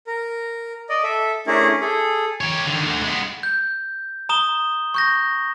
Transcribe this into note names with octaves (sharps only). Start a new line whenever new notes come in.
A#4
D5 D#5
A4 E5
A3 C#4 D4 E4 G#4 A#4
G#4 A4
G4 C#5
D3 D#3
D2 D3
G#3 B3
G6
A#5 D#6 E7 G7
C#6 G6 A#6